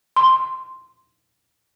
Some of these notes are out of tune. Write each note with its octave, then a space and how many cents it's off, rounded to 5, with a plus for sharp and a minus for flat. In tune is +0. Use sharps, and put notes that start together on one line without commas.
C6 +0